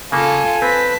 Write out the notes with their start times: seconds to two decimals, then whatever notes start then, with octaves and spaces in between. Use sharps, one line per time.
0.12 C#3 A#3 F4 A4 G#5
0.62 C4 B4 A5 B6